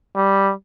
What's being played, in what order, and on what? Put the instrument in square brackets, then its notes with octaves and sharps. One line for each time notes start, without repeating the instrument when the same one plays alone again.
[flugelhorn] G3